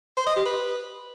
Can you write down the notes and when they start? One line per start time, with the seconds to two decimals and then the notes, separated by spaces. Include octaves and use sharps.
0.17 C5
0.27 D#5
0.36 G4
0.46 B4